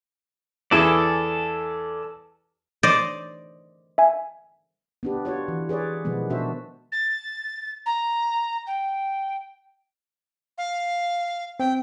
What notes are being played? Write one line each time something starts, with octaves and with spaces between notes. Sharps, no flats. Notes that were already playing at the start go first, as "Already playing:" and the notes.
E2 E4 G#4 A4 D5
C5 D5 D#5
E5 G#5
B3 D4 G4
F4 F#4 C#5 D5
E3
G#4 B4 C#5 D5
B2 D#3 F3 G#3 B3
B2 D4 F#4 C5 E5
A6
A#5
G5
F5
C4 G5